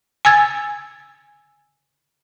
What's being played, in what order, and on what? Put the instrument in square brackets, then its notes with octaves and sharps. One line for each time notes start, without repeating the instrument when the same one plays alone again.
[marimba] G#5 E6 G#6 A6